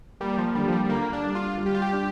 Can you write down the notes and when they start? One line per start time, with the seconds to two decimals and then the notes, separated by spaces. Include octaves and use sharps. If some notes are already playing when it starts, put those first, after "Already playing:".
0.20 G3 A#3
0.38 F3
0.55 D3 G3
0.68 F3
0.73 G3
0.85 G3
0.89 D3 A#3
1.13 D4
1.24 G3
1.35 F4
1.58 G3
1.66 G4
1.74 F4
1.82 G4
1.93 D4